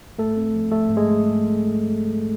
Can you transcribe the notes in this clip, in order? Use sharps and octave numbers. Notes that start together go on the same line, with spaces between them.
G#2 A3 A4
C4
F3
A3 A4
G#2
G#3 G#4